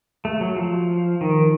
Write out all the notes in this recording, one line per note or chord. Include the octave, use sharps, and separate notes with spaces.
A3
F#3
F3
D#3